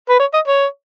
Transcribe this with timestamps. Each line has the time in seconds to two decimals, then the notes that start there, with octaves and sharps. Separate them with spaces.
0.09 B4
0.19 C#5
0.34 D#5
0.47 C#5